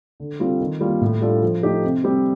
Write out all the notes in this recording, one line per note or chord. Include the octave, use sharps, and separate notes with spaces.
D3
G3 C4 F4 A4
D#3
G3 A#3 F4
A2
G3 D4 F4 A4
F3
A3 D#4 G4
C3
G3 C4 G4